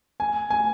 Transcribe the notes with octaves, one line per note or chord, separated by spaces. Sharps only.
G#5
G#5